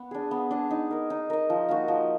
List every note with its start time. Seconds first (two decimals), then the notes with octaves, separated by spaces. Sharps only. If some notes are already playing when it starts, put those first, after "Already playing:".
Already playing: B3
0.11 D4 G#4
0.31 B3
0.51 D4 G#4
0.71 D#4
0.91 A#4 D#5
1.10 D#4
1.30 A#4 D#5
1.50 F3
1.69 A#3 D#4 F#4
1.88 F3